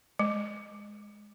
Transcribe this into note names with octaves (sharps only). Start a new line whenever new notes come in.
G#3